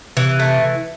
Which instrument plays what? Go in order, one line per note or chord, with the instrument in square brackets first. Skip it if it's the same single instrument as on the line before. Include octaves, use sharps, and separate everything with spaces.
[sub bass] C3 [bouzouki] E3
[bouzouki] A3